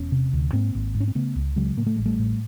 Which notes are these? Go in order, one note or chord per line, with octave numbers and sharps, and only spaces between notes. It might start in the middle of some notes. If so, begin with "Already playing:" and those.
Already playing: E1 B3 C#4
C3
D2
G#2 A#3 C4
G#1
G#2
C#4
C4
C#3 A3 B3
C#2
C#3 F#3 G#3
A2 A#3
A3
A1 G#3
G3 A3
A2